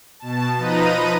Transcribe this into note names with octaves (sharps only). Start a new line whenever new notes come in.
B2 A5
F3 D#4 B4 D#5 A#5 D#7